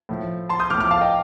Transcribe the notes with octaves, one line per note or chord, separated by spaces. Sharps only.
A2 F3
A5 C6
D#6 G6
A2 F3 D6 F6
D6 F6
F5 A5
D#5 G5